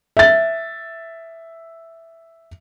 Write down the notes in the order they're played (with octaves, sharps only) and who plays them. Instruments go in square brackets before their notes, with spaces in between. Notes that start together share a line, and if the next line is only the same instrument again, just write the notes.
[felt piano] E5 A6